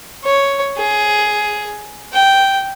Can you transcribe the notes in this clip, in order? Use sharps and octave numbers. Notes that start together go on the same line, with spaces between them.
C#5
G#4
G5